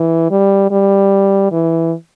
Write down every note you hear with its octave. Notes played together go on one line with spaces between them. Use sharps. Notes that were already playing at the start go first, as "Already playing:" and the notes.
Already playing: E3
G3
G3
E3